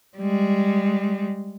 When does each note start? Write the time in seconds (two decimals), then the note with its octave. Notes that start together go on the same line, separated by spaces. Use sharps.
0.18 G3 G#3